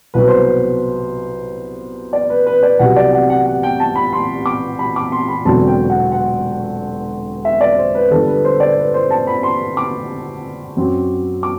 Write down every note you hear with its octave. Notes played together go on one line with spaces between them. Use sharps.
C2 B2 F#3 B4
C5
B4
D5
B4
B4
D5
C2 C3 F#3 F#5
D5
F#5
F#5
F#5
G5
A5
B5
C6
D6
B5
D6
C6
B5
E1 E2 D3 F#3 C4 A5
G5
F#5
F#5
E5
D5
C5
B4
G1 G2 D3 A4
B4
C5
D5
B4
C5
A5
B5
C6
D6
F#2 F#3 C4
D6